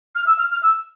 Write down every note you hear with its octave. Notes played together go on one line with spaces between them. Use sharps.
F6
E6
F6
F6
E6